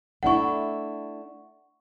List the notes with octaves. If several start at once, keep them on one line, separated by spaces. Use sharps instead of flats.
A3 D4 E4 F#5 C#6